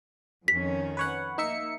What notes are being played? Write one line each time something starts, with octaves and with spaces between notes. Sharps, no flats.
F2 D#3 C#4 B6
B4 C#5 F#5
A#3 D#4 E5 C#7